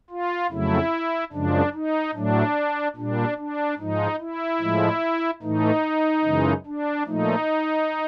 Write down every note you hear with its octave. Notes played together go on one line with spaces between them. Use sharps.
F4
F2 C#3 F#3 A3 E4
F#2 C#3 F3 G#3 D4
D#4
A2 F#3 A3 D4
A#2 G3 D4
D4
G#2 F3 G#3 D#4
E4
A2 F3 G#3
A2 E3 A3 D#4
F#2 C#3 E3 G#3
D4
A#2 F3 A3 D#4